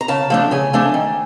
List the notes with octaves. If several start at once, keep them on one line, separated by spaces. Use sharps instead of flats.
A#5
C#3 A5
F3 A3 D4
C#3 G#5
F3 A3 D4
D#3